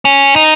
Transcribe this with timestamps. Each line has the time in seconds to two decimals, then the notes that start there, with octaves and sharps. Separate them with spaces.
0.05 C#4
0.36 D#4